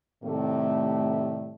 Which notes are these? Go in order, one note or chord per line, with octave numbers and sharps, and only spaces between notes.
A2 C3 D#3 G3 A3